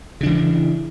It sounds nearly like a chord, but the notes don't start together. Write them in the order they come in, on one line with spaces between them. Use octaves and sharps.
C#3 D4 E3